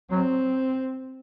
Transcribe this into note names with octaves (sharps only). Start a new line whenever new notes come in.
F#3 C4